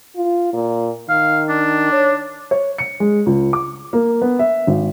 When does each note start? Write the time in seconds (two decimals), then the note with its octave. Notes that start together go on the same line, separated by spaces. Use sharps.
0.17 F4
0.53 A#2
1.09 D#3 F5
1.49 D4
1.92 C#5
2.51 C#5
2.78 C#7
3.00 G#3
3.26 C#2
3.53 D6
3.93 A#3
4.22 B3
4.39 E5
4.67 G#1